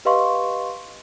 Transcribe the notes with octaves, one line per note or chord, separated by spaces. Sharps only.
G4 B4 D#5 F5 C6 C#6